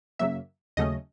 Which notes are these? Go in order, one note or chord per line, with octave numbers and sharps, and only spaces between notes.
F#2 C#3 F#3 A#3 E5
D#2 C#3 F#3 A3 C#4 D#5